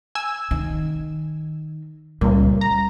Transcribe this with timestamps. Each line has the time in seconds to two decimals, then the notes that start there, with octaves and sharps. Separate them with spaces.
0.15 G#5 E6
0.51 D#3
2.21 C#2 A#2 G3
2.61 A#5